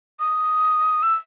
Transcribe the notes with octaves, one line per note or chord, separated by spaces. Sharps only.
D#6
E6